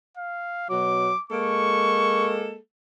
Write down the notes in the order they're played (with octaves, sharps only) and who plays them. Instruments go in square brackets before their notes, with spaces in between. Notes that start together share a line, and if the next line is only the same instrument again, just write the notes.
[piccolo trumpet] F5
[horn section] B2 F#3 [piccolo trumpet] D6
[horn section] G#3 A#3 A4 [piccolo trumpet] C#6